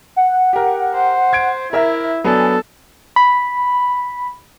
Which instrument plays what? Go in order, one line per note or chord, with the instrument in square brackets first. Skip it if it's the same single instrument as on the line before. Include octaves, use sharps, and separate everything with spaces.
[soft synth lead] F#5
[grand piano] G4 A#4
[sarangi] C5
[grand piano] G#6 D7
[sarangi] E4 [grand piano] A#4 E5 A#5
[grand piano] F#3 B3 D4 [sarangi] A4 [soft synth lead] G#5
[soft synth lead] B5